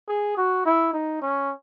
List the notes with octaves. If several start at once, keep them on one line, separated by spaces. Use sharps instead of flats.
G#4
F#4
E4
D#4
C#4